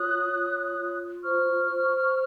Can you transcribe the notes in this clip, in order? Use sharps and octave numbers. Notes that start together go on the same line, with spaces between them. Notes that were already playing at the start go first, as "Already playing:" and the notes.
Already playing: F4 C#5 D#6 F#6
F4
F4
C5 C#6 F6
C5